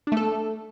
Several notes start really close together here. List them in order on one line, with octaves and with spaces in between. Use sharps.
D4 A3 A4